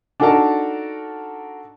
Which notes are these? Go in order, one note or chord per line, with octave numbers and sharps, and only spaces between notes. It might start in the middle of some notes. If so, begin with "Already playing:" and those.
D4 D#4 F#4 A4 A#4 A5